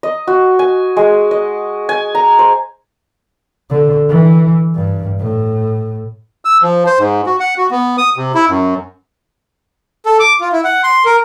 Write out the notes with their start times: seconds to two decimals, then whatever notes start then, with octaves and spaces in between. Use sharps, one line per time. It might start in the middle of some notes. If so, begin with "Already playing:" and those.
0.03 D#5
0.27 F#4
0.59 G#5
0.97 G#3
1.31 D#5
1.89 G#5
2.15 A#5
2.39 C5
3.70 D3
4.09 E3
4.75 G2
5.19 A2
6.45 E6
6.62 F3
6.86 C5
6.99 G#2
7.26 F#4
7.40 F#5
7.58 F#4
7.71 B3
7.98 D#6
8.17 C3
8.34 E4
8.49 F#2
10.06 A4
10.20 D6
10.41 F4
10.52 E4
10.65 F#5
10.84 C6
11.05 A#4